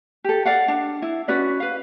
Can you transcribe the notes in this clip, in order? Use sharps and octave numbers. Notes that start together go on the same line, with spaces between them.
G4 A4
D5 F5 F#5
D4
E4
C#4 F#4 B4 D5
B4 F5